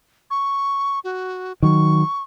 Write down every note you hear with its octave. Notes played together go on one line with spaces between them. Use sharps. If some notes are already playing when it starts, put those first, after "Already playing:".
C#6
F#4
D#3 F#3 C#6